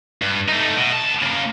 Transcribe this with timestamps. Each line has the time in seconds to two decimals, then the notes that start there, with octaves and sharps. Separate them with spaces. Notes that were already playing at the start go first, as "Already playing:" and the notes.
0.22 G2
0.49 A3 D#4
0.77 B2
0.93 D2 A5
1.23 C#3 A#3